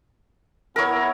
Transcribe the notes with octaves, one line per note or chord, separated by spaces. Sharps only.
B3 E4 A#4 C#5